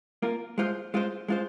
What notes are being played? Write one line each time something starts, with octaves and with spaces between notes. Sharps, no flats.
A#3 F4 A#4
G#3 F4 C5
G#3 F4 C5
G#3 F4 C5